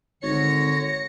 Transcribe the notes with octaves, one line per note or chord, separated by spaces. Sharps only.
G#1 D3 C#5 A#6 C#7